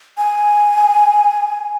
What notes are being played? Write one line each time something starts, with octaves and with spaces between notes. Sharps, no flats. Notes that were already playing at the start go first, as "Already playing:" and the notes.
G#5